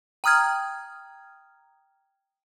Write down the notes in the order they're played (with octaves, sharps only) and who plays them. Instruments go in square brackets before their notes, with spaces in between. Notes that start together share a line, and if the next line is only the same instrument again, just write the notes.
[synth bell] G5 A#5 D#6 F6 G#6